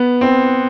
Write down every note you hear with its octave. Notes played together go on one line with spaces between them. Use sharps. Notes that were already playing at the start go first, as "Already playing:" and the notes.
Already playing: B3
C4